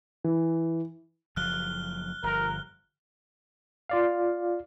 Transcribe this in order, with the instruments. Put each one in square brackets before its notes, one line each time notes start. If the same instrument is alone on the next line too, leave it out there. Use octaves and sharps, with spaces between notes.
[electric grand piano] E3
[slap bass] F#1 F3 F#3 [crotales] F6 F#6 G7
[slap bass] G1 F3 [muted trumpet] A#4
[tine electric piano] F4 D5 F5